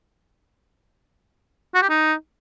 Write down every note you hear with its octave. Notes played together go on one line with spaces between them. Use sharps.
F#4
G4
D#4